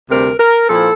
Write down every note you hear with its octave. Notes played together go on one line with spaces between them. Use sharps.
D2 C3 G3 C4 A#4
A#4
A#2 F3 C4 E4 A4